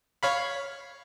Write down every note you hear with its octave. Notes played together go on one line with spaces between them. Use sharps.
C#5 F5 B5